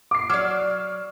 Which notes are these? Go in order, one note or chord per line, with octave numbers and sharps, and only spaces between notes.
D6 C7
F#3 D5 F6